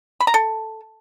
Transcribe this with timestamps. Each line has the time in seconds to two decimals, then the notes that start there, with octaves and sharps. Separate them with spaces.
0.20 B5
0.27 A#5
0.34 A4